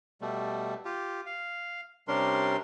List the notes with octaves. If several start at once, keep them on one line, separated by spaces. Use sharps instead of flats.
B2 G3 A3
F4 G4
F5
C3 G3 C#4 D4 A#4 C6